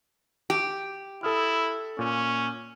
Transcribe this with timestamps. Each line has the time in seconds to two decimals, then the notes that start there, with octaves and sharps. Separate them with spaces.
0.50 G4
1.23 E4 A4 D#6 F6
1.99 A#2 C#4